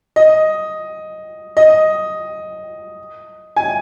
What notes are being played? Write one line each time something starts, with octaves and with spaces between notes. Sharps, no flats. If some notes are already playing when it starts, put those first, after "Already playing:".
D#5
D#5
G#5